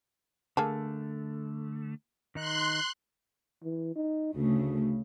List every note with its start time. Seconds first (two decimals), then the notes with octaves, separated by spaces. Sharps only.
0.57 D3 A3 A#3 G#4 A4
2.35 D#3 D#4 C6 F#6
3.64 E3
3.95 D#4
4.34 D2 C#3 A3